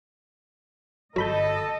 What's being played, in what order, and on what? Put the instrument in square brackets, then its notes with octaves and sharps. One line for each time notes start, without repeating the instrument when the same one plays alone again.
[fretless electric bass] G1 [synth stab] F#3 B5 G6 [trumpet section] A4 [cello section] D#5